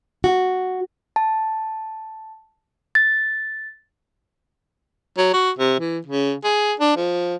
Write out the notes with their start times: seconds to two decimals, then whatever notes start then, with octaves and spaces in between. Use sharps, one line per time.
0.24 F#4
1.16 A5
2.95 A6
5.17 F#3
5.33 F#4
5.59 C3
5.80 E3
6.07 C#3
6.44 G#4
6.80 D4
6.97 F3